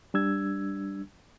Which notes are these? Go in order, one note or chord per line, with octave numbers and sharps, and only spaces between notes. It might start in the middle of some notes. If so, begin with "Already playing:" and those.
G3 D4 E6 G#6